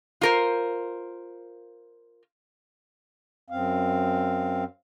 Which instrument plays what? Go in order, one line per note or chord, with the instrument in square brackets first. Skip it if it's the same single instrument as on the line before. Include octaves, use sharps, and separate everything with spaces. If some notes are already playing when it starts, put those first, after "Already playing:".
[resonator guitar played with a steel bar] F4 A#4 C5
[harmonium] F#2 C4 F5